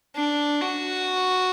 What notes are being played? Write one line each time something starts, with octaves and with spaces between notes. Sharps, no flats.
D4
F#4